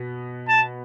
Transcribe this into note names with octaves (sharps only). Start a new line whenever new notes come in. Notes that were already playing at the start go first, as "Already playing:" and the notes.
Already playing: B2 B3
A5